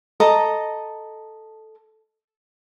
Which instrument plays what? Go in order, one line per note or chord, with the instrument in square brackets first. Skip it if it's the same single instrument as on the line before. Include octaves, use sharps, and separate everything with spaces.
[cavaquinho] A4 D#5 A5 A#5